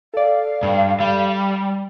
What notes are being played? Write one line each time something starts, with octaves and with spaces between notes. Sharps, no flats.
A4 D5 F5
G2
G3